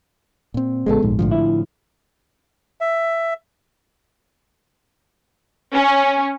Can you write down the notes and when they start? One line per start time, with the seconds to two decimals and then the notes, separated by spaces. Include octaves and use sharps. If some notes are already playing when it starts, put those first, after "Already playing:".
0.54 A#2 C4
0.86 A1 A2 C#3 G#3 B3 A4
1.02 D1 A#1 G#2
1.19 A2 D3 F3
1.31 E4
2.81 E5
5.73 C#4